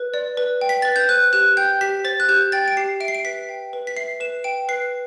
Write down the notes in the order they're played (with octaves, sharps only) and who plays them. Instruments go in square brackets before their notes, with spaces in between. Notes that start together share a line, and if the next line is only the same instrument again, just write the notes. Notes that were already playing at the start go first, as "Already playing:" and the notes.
Already playing: [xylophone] B4
D5
B4
G5
B6
B4 A6
G6
C5 F#6
G4 F#6
G5 G6
G4 B6
C5 A6
F#6
G4 G6
G5 A6
D7
G4 C7
E5 D7
C7
D7
B4 B6
G5
B4
B6
E5 C7
B4 E7
G5 D7
B4 C7